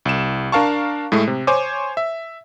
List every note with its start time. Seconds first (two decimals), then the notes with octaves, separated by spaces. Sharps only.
0.05 C2 E7
0.52 D4 A#4 F5 A5 C#6
1.12 A2 G#3 A3
1.27 C3
1.47 C5 C#5 G#5 D6
1.97 E5